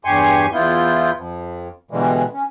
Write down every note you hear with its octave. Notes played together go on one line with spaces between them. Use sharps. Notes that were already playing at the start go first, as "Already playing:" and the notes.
E2 G2 G4 G#5 C6 C#6
E2 B3 E4 F4 G6
F2
B2 D3 E3 G3 G#3
C#4